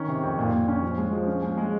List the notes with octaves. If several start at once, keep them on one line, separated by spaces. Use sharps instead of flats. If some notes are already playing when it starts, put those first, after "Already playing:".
Already playing: D#3 C#4
C3
F2
A#2
A#2
C#4
F3
G#3
F3
C#4
G#3
G#3